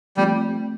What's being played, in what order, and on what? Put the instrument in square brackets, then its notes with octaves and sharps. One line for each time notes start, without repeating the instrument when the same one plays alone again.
[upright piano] F3 A3 C4 [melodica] G3